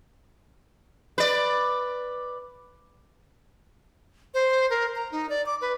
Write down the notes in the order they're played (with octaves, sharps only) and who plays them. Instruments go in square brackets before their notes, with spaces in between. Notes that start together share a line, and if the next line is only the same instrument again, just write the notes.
[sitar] B4 D5
[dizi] C5
A#4
A#5
D#4
D5
D6
B4